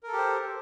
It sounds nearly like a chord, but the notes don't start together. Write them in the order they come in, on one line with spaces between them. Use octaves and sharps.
A#4 A4 G4 C5